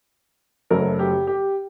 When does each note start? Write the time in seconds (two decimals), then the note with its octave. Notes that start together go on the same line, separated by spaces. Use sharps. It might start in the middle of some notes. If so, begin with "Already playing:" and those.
0.70 F#1 F#2 F#3 A3 A#4
0.99 G4
1.27 G4